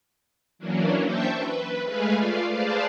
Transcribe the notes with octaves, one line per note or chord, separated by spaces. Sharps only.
E3 F#3 A#3 C#4 D4
C5 E5 G5 A5 C#6 G6
B4
G#3 A3 B4 F5 G#5
A3 F4 D5 F5
G#4 B4 C5 D5 F5 A5